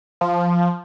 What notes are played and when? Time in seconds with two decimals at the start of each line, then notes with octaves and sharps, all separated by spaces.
0.21 F3